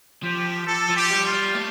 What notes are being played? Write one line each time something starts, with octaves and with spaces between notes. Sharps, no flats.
F3 G4
A4
F3
G4
G3
F4
G3
A3